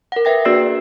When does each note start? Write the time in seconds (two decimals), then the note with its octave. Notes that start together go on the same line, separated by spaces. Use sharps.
0.12 A#4 F#5
0.25 B4 E5 G5 A#6
0.45 A#3 D4 F#4 G#4 D5 C7